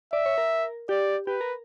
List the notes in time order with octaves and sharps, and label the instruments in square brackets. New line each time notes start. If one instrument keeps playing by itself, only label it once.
[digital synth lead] D5 [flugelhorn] E5
[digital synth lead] C#5
A#4
[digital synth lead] G4 [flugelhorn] D5
[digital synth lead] G4 [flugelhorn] B4
[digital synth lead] A#4